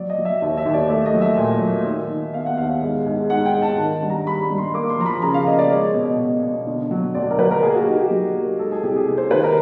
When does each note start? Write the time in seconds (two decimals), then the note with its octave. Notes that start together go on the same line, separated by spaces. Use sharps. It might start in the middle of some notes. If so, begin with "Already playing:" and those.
Already playing: F#3 D5
0.10 D#5
0.18 F#3
0.25 E5
0.42 D#2 E5
0.57 E5
0.65 D#2
0.74 D5
0.89 A3 E5
1.06 D#5
1.14 F#3
1.21 E5
1.37 A#2
1.61 F#3
1.86 D#3
2.10 D#3
2.34 B3 F5
2.46 F#5
2.57 D#2 F5
2.82 G#2
3.06 G#2
3.30 G#2 F#5
3.45 G5
3.54 G#2
3.62 A5
3.78 D#3
4.03 G2
4.10 A#5
4.26 G3 B5
4.42 B5
4.50 G2
4.58 C6
4.74 A#3 D6
4.90 C6
4.99 F3 A#5
5.06 B5
5.22 C#3 A#5
5.34 F5
5.47 A#3 D#5
5.59 D5
5.70 G#3 C#5
5.94 B2
6.19 B2
6.42 B2
6.67 D3
6.91 F#3
7.15 D2 D5
7.31 A#4
7.39 F#3 B4
7.51 A#4
7.63 A#3 G#4
7.75 F#4
7.86 D#4 G4
7.99 G4
8.10 F#3
8.35 A#3
8.59 G#3 A4
8.72 G#4
8.83 C2 G4
8.96 G#4
9.08 C3
9.18 C5
9.31 D#3 B4
9.44 A#4